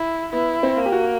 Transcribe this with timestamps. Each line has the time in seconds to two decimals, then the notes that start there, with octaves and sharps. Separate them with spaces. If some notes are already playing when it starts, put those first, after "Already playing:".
Already playing: E4
0.33 B3 E4
0.63 C4
0.77 A#3
0.86 G4
0.92 F#4